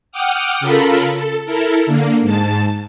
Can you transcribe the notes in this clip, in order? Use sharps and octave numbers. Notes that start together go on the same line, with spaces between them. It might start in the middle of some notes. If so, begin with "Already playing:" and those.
F#5 G5 D6 D#6 F6
C#3 F4 A4 A#4 B5
A4
E4 A4 A#4
D3 A#3
G#2 A5